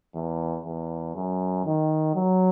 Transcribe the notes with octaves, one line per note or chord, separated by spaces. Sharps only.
E2
E2
F#2
D#3
F#3